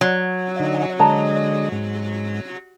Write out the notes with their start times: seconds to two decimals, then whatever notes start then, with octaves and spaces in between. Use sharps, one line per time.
0.01 F#3
0.60 D3 D#4
0.99 D3 G#3 C#5 D#5 A5 A#5
1.72 G#2